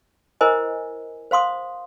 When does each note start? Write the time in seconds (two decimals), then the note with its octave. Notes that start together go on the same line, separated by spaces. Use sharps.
0.41 E4 A#4 C5 D#5 G#5
1.31 C5 F5 C6 D#6